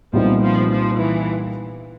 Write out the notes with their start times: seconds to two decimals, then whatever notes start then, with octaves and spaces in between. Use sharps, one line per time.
0.13 C2 A#2 F3 G3 B3 D#4
0.41 F3
0.70 F3
0.98 E3